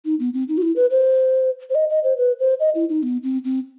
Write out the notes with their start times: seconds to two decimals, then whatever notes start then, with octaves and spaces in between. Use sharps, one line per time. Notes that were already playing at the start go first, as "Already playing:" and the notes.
0.05 D#4
0.20 B3
0.34 C4
0.49 D#4
0.58 F#4
0.62 E4
0.76 B4
0.91 C5
1.70 C5
1.75 D#5
1.90 D#5
2.04 C5
2.17 B4
2.39 C5
2.60 D#5
2.75 E4
2.89 D#4
3.03 B3
3.24 C4
3.45 C4